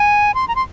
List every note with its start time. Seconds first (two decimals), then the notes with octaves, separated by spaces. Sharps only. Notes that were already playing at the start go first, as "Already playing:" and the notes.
Already playing: G#5
0.34 C6
0.48 A#5
0.55 C6